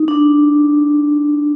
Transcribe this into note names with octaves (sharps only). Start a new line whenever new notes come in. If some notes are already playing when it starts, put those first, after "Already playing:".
Already playing: D#4
D4